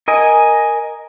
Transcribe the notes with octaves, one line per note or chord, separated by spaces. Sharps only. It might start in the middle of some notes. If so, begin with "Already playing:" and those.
A#4 D#5 G#5